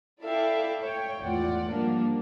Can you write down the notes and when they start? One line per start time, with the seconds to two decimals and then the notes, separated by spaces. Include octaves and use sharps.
0.23 E4 A4 D5 E5 F5 G5
0.81 C#5 G5
1.22 G#1 E2 A2 F4 D5 F#5
1.69 F3 G3 A#3 D4